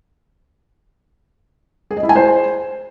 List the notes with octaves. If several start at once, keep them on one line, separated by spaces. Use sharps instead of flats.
G#4
D#5
E4
G#5
C5